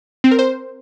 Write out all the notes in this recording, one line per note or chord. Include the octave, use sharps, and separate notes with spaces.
C4
A#4
C5